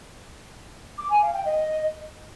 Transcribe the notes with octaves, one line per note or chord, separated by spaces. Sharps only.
D6
G#5
F5
G5
D#5